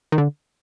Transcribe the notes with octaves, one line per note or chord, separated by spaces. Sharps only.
D#3
D3